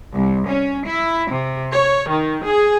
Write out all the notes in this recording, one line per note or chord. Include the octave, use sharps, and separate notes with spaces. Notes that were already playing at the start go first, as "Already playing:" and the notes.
C2
C#4
E4
C3
C#5
D#3
G#4